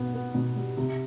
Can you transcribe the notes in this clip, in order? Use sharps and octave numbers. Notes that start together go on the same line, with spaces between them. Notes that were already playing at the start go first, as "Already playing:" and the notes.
Already playing: B2 B3
B3
B2
G3
C3